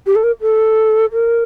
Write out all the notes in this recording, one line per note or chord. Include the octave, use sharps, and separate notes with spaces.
G4
A4
A#4
A4
A#4